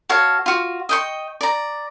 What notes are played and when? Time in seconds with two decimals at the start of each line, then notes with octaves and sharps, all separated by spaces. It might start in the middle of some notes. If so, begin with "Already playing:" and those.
0.09 F#4 A4 C#5 F5
0.46 F4 F#4
0.89 D#5 G5 C#6
1.41 D5 A#5